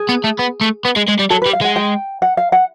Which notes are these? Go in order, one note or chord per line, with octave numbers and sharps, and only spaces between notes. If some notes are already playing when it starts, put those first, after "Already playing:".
Already playing: G#4
B3
A3
B3
A3
B3
G#3
G#3
G3
F#3 A4
G3 B4
F5
G#3 F#5
G5
F#5
F5
F#5